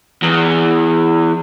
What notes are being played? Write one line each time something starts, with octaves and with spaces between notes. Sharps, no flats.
E2